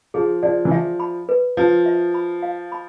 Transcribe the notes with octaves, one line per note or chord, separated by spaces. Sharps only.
F3 G#4
F3 D5
E3
F3 E5
B5
B4
F3 B4
E5
B5
F5
B5